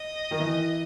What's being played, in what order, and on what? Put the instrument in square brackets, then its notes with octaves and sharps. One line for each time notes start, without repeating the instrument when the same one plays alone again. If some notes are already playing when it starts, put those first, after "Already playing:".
Already playing: [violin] D#5
[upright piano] D#3
E3